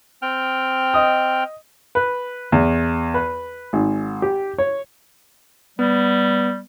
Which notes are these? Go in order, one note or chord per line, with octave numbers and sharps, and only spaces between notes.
C4 G5 F6
D#5 D#6
B4
E2
B4
G#1
G4
C#5
G3 B3